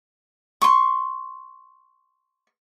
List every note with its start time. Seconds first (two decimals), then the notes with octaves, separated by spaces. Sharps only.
0.62 C6 C#6